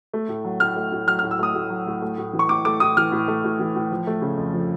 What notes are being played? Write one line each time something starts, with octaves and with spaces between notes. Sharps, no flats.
A3
A2
F#3
A2 F6
A3
A2
F#3 F6
A2 F6
E6
A3 D#6
A2
F#3
A2
A3
A2
E3
C#6
A2 D6
A3 D6
A2 D#6
E3 F6
A2
A3
A2
E3
A2
F3
A3
C#3
F2
F3